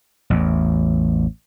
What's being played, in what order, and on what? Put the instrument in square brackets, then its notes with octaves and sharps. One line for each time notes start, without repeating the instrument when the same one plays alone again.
[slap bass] A1 E2